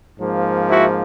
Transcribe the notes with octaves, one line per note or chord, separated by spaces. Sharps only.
G#2 F3 A#3
E4 F#4